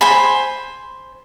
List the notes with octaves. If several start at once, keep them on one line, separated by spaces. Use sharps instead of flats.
C5 G#5 B5